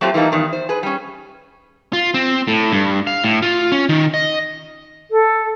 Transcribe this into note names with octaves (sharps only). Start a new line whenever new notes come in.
F#3 A3 A#3 C4 F4 G4
E3 G3 A3 A#3 D#4
E2 G2 D#3
C5
G#4 B4
G3 C#4
F4
C4
A2
G2
F5
A2
F4
C#4
D#3
D#5
A4